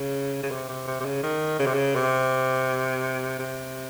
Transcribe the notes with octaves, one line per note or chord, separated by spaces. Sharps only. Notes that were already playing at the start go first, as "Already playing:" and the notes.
Already playing: C#3
C#3
C3
C3
C3
C3
C#3
D#3
C#3
C3
C#3
C3
C3